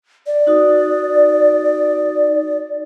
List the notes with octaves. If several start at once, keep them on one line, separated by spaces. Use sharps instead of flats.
D5
D#4 F#4 D#6